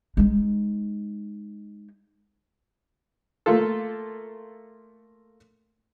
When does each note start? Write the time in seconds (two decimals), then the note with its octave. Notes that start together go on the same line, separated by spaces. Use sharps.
0.17 G#3 D#4
3.46 A3 A#3 F4 A4